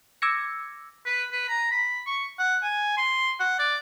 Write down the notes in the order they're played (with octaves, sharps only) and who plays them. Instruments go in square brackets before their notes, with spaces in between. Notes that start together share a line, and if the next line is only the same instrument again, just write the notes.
[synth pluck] D6 E6 G#6 A#6 C#7
[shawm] B4
B4
A#5
B5
C#6
F#5
G#5
C6
F#5
D5